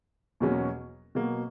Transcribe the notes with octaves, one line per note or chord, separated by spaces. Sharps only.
E2 B2 F#3 A#3 C#4
B2 F#3 A#3